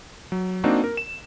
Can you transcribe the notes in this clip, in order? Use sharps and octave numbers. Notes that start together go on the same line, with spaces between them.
F#3
A#3 C4 D4 D#4 F#4
A#4
E7